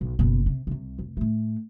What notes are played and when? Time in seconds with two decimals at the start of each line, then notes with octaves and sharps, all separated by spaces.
0.01 B1
0.19 F#1 B2
0.46 C3
0.67 C2 C3
0.99 F1
1.17 A2 A3